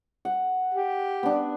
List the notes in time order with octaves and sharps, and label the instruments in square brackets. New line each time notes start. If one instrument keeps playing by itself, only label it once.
[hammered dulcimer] F#5
[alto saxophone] G4
[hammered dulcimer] B3 D4